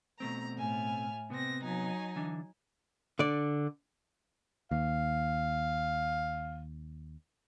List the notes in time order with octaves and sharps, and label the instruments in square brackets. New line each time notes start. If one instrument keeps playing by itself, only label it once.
[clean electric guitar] B2 A3 C4 [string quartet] A#5
[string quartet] A2 G#5 F6
[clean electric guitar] C3 B3 [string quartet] C4 A#6
[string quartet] F#3 D#4 G#5
[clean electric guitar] D3 E3 D4
[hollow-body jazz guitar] D3 D5
[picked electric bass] D#2 [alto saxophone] F5